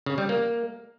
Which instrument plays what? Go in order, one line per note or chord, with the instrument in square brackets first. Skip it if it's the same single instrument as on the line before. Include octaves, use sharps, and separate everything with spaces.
[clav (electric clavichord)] C#3
G3
A#3